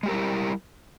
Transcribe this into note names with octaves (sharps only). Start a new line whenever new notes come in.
G3 G#3 E4 G4 A#4